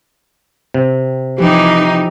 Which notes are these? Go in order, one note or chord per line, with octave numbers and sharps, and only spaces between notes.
C3
E3 F3 D#4 G4